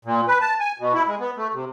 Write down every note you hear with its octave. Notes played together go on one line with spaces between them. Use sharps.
A#2
B4
A5
G#5
B2
E4
G#3
B3
A3
C3